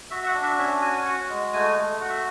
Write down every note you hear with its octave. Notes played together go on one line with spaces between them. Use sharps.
F#4 E5
E5
F#5
D4
E5
C#4 E5
F#4 G#5
G#5
F#4 F#5
G#3
A3 G#5
A3
F#4 F#5
E5